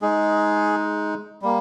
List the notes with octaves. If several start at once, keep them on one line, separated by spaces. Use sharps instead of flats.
G#3 D#4 G#4
G3 A#3